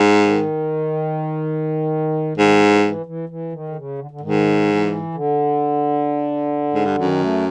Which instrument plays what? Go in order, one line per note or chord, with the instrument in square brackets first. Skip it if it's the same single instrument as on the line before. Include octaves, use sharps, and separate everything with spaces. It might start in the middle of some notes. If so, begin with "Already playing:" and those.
Already playing: [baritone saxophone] G#2
[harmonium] D#3
[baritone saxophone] G#2 [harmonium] D#3
[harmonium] E3
E3
E3
E3
D#3
D3
C#3
D3
D3
[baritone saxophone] G#2 [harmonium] D#3
[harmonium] E3
D3
[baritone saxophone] G#2
G2
[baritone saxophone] F#2 [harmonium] D#3
[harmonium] A3